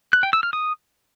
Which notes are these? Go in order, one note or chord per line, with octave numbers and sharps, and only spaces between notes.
F#6
G5
E6
F6
D#6